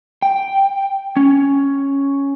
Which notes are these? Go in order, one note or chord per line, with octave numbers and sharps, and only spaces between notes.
G5
C#4